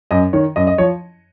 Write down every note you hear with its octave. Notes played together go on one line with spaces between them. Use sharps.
F#2 D#5
D#3 C#5
F#2 D#5
D#5
F3 C#5